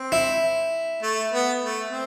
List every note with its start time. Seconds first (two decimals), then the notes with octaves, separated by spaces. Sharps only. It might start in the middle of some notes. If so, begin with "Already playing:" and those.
Already playing: C4
0.12 E4
1.02 A3
1.32 B3
1.61 A3
1.91 C4